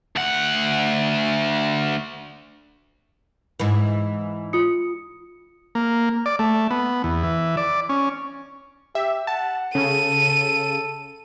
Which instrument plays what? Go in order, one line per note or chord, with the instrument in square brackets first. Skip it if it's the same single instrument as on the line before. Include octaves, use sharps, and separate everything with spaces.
[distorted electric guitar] D2 F#5
[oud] G#2 E3
[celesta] F4 D#6 C#7
[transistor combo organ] A#3
D5
A3
B3
E2
E3
D5
C#4
[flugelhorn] G4 [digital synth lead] E5
[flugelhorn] F#5 [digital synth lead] A5
[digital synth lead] C#3 [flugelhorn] A4 [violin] D#7